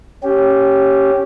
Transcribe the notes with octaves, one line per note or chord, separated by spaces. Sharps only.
C#4 G4